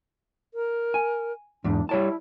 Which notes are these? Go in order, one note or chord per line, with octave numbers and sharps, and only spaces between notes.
A#4
G#5
E2 G#2 D4
G3 E4 C#5 A5